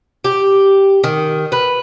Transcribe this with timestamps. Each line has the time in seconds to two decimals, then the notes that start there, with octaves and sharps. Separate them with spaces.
0.24 G4
1.04 D#3
1.52 B4